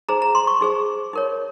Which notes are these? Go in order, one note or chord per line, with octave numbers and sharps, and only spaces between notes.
D#4 G#4 C5 A#5
A#5
C6
C#6
D#4 G#4 C5
D#4 A#4 C#5